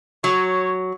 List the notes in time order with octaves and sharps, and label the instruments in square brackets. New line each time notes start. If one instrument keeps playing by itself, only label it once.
[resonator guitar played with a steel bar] F#3 [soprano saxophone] C#5